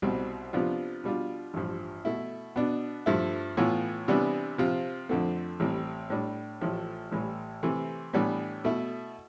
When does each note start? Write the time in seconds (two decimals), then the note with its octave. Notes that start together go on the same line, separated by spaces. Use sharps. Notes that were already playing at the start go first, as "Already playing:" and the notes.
0.02 C2 B2 G3 C4
0.53 C3 F3 B3 D4 F4
1.04 B2 G3 D4 F4
1.54 A1 G2 F3
2.05 B2 A3 E4
2.56 B2 B3 D4
3.06 G2 F3 A3 E4
3.57 A2 E3 B3 F4
4.08 C3 E3 G3 B3 D4
4.58 C3 F3 C4 F4
5.09 F2 D3 A3 C4
5.60 A1 A2 G3 C4
6.10 A2 G3 D4
6.61 A1 A2 F3 A3
7.12 A1 A2 E3 G3
7.63 C3 E3 A3 C4
8.13 A2 E3 G3 B3 D4
8.64 B2 A3 E4